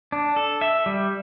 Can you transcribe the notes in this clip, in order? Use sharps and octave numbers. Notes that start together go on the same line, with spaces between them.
D4
A4
E5
G3